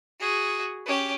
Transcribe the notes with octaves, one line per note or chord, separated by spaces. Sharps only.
F#4 G#4
C#4 G4